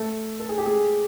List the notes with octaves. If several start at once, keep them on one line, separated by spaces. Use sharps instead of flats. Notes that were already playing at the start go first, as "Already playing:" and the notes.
Already playing: A3 A4
A4
G#4
G4
G#3 G#4